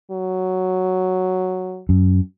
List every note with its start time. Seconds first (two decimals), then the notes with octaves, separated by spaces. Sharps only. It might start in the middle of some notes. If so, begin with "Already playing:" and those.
0.11 F#3
1.89 F#2